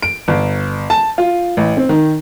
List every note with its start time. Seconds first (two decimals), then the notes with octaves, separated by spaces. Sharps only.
0.02 D7
0.28 G1
0.90 A5
1.18 F4
1.57 A1
1.77 C4
1.89 D#3